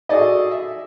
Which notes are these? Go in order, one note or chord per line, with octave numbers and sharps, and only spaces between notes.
F#4 G#4 A4 D5 D#5
E5